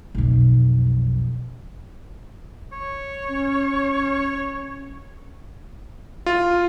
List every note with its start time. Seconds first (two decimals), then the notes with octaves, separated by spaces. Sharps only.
0.15 B1 F2
2.72 C#5
3.29 C#4
6.26 F4